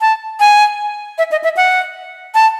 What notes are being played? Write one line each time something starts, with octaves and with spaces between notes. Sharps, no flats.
A5
G#5
E5
D#5
E5
F#5
A5